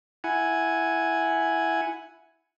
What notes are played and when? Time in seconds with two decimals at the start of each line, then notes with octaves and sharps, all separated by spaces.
0.24 E4 F#5 G#5